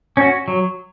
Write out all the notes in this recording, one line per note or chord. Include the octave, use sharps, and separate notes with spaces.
C#4 F#4
F#3